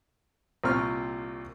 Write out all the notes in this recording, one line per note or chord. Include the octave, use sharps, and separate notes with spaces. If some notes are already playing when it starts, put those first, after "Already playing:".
C2 A#2 C4 C#6 F6